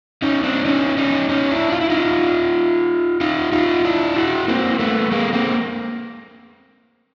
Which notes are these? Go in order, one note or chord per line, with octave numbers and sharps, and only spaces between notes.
C#4 D#4
C4 D4
C#4 D#4
C#4 D#4
C#4 D#4
D4 E4
F4
E4
D#4 F4
D#4 F4
D#4 F4
D4 E4
E4 F#4
A#3 C4
A3 B3
G#3 A#3
A#3 C4